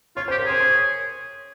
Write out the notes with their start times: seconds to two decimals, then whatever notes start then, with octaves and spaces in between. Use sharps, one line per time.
0.16 F4 C#5
0.28 C5
0.31 G4
0.39 A#4
0.46 G#4 C5
0.60 C#5